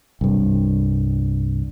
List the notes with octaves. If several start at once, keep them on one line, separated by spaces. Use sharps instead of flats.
C2 G2